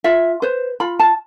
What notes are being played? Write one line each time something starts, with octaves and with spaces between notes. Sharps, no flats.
F4 E5
B4 C5
F4 B5
A5